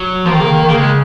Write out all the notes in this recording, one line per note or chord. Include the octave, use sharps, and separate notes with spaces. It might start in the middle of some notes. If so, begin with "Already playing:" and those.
Already playing: F#3
F3 A#3
D#3
C#3
D#3
D#3
C#3 A#3
G#3